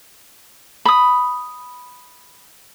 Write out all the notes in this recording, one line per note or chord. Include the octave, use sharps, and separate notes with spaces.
B5 D#6